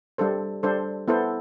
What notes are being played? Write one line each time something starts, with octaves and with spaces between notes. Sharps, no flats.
G3 D4 A4 C5
G3 D4 A4 C5
B3 E4 A4 C5